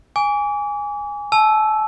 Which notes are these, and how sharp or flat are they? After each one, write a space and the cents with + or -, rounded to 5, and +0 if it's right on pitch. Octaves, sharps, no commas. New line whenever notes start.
G#5 -10 D6 -40
A5 -35 E6 +0